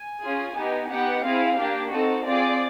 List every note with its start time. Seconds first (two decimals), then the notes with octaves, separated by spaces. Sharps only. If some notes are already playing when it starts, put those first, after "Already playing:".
Already playing: G#5
0.23 C#4 F4 G#4
0.57 B3 D#4 G4
0.90 B3 D#4 G4 F#5
1.24 C4 E4 G#4 F5
1.58 A#3 D4 G4
1.92 C4 D#4 F#4 A4
2.26 C4 F4 G#4 D5